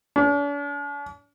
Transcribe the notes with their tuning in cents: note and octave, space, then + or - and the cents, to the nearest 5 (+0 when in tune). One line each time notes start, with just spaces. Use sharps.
D4 -45